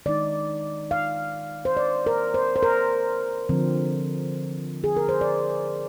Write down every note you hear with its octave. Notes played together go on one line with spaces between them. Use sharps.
D#3 G#3 D#4 D5
F5
C5
D5
A#4
C5
C5
A#4
D3 F3 C4
G#4
A#4
C5
D5